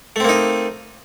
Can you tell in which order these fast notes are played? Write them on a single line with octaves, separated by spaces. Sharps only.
A3 C4 A#3 D#4